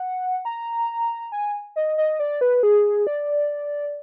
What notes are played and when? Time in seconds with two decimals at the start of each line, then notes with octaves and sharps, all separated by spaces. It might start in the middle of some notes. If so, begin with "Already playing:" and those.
Already playing: F#5
0.45 A#5
1.32 G#5
1.76 D#5
1.98 D#5
2.20 D5
2.41 B4
2.63 G#4
3.07 D5